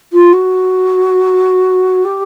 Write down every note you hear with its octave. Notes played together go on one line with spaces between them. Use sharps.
F4
F#4
G4